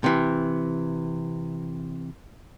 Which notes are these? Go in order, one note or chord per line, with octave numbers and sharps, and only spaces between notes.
C3 E3